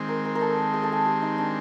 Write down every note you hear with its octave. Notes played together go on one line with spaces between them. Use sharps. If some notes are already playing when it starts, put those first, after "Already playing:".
Already playing: D#3 G#3 C4
A#4
A#4
A#4
A4
G#4
A4
G#4
G4
D#4
D4